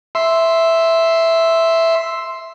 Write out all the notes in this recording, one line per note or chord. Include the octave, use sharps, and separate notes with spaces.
E5 C6